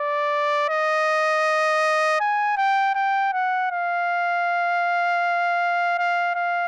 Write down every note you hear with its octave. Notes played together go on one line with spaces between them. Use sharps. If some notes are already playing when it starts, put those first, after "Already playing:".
Already playing: D5
D#5
G#5
G5
G5
F#5
F5
F5
F5